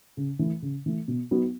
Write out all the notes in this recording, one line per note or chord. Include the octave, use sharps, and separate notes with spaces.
C#3
E3 A3
C#3
E3 A3
B2
F#3 B3 D#4 F#4